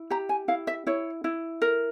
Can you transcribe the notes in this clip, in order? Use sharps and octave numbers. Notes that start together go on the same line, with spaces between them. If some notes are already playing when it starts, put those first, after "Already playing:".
Already playing: E4
G4 A#5
G#5
E4 F5
E5
E4 C#5
E4
A#4